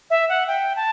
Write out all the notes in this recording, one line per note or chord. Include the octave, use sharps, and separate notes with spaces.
E5
F#5
G5
A5